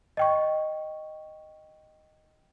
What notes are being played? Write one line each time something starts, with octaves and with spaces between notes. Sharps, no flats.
D#5 G5 C#6